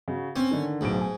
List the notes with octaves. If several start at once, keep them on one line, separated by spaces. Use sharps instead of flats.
C#3 F#4
C4 C#4
D3 D#3
D1 B1 G#2 D7
G#5